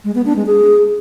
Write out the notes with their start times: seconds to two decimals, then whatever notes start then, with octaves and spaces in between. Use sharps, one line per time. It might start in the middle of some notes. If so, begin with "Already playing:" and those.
0.04 G#3
0.15 B3
0.25 D4
0.36 G#3
0.46 G#4